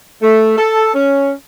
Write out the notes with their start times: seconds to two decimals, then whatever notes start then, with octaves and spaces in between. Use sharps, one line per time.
0.23 A3
0.58 A4
0.94 C#4